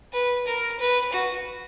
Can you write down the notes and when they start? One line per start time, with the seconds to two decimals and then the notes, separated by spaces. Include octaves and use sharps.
0.13 B4
0.47 A#4
0.79 B4
1.12 F#4